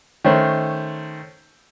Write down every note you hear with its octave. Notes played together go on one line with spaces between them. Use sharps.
D#3 A3 C#4 C5